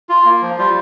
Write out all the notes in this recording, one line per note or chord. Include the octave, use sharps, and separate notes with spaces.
F4
A#3
F3
G3 F4